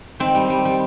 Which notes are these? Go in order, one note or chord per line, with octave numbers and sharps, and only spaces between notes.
D#3 C4
G3
G3
G3